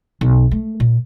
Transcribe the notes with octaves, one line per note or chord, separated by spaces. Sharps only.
B1
A3
A#2